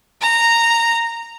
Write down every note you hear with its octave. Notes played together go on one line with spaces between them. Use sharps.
A#5